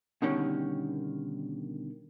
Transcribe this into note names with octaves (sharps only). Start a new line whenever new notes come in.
B2 D3 D#3 G3 C#4